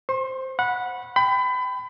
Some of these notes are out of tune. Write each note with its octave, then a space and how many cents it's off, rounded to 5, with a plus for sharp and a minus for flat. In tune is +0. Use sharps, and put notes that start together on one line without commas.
C5 +0 C6 +45
F#5 -15 B5 -10
G5 +0 B5 +30